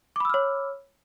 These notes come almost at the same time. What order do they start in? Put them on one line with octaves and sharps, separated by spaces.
D6 B5 E6 F6 C#5